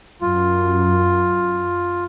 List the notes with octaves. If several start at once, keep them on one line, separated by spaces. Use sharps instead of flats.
F#2 F4